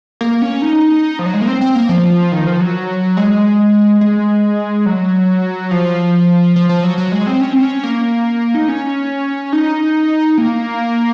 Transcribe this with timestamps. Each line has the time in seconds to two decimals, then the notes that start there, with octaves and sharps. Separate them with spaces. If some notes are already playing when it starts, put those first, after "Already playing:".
0.21 A#3
0.42 C#4
0.62 D#4
1.19 F3
1.26 F#3
1.34 G#3
1.41 A#3
1.47 C4
1.61 C4
1.75 A#3
1.89 F3
2.32 D#3
2.47 F3
2.60 F#3
3.17 G#3
4.01 G#3
4.86 F#3
5.71 F3
6.56 F3
6.69 F3
6.84 F#3
6.98 F#3
7.12 G#3
7.27 C4
7.41 C#4
7.52 C4
7.62 C#4
7.83 A#3
8.55 D#4
8.68 C#4
9.53 D#4
10.38 A#3